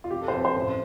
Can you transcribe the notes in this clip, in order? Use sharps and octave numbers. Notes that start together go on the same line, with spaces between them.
F4
F1 G4
A4
C5
F2 B4
C5
A1